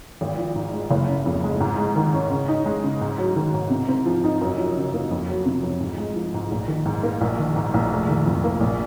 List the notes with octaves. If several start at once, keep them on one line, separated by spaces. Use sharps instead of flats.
G#1
F3
G#2
G#3
F#1
C#3
F2
G#3
G#2
G#3
D#3
C#4
C#3
D#4
G#3
C#3
G#2
F#3
D#3
G#2
C3
C4
F3
D#4
F#2
F3
C#3
A#3
F2
F#3
C3
F2
G#2
G#3
F3
G#2
A#1
D#3
G#2
A#3
A#1
D#3
G#2
A#1
F1
D#3
F2
A#3
A#1